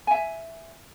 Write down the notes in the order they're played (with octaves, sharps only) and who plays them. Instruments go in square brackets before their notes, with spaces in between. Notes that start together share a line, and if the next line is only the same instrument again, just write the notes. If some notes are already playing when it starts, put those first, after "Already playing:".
[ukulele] E5 G#5